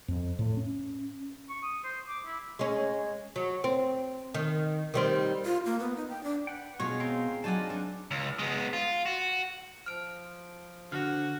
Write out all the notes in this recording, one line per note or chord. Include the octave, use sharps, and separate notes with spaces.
F2
A2
C#4
C#6
D#6
C5
D6
E4
G#3 C#4
F#3
C4
D#3
D#3 G3 C4
F4
A#3
B3
D#4
G5
D4
B4 F#5 G5
B2 G#3 F4 C#5 C#6
C4 F5 G5 A#5
F#3 D#4 F4 D5 F#5 G#5 A5
E3 C4 D4 D#4
C#2
G#3 B3
F4
F#4
F3 F6 D7
D3 F#4 F6